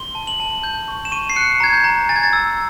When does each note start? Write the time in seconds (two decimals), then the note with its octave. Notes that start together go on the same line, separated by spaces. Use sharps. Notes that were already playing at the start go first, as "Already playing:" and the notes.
Already playing: C6 G7
0.15 A5
0.27 F#7
0.40 A5
0.64 G6
0.88 C#6
1.05 E7
1.12 C#6 D#7
1.30 C7
1.36 F#6 C#7
1.60 A#5 G#6
1.73 G6
1.84 A#5
2.09 G#5 A6
2.16 G#6
2.23 A6
2.33 E6